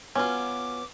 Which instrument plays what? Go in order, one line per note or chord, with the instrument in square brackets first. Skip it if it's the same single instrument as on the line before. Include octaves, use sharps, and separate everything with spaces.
[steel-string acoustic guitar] B3 F#4 [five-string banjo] C#4 F4 [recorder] D6